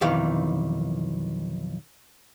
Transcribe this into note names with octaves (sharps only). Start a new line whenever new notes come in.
B1 F2 D#3 E3 F5